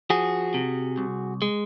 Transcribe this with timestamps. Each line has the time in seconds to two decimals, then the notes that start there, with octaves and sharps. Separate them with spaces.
0.10 F3 F#4 G#4
0.54 C3
0.98 C2
1.42 G#3